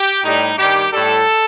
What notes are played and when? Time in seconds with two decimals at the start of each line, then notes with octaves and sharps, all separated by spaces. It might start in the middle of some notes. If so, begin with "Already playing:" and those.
Already playing: G4
0.24 A2 G3 D#4
0.58 G2 D#3 G3 G4
0.93 A2 G3 A4